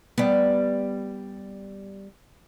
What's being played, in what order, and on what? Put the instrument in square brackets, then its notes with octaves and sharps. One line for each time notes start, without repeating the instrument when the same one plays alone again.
[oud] G3 B3